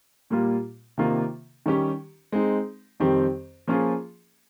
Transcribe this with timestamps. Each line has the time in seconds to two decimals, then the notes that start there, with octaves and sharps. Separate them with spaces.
0.30 A#2 G3 A#3 F4
0.98 C3 D#3 A#3 F4
1.66 D#3 G3 C#4 G4
2.32 G#3 C4 D#4
3.00 F2 D#3 G3 C4 G4
3.67 F3 A#3 C#4 F4 G#4